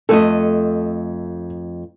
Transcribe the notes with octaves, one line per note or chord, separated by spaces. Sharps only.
F2 A3 A4 D#5